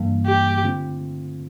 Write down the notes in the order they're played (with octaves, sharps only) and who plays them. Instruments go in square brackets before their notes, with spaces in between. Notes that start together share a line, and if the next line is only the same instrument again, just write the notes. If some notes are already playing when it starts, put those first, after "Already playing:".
Already playing: [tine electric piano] G2 E3 G3 A#3
[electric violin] G4
[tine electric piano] D3 A3 C4 F4